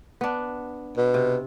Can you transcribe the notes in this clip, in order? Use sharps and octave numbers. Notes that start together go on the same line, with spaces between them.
B3 D4
B2
C3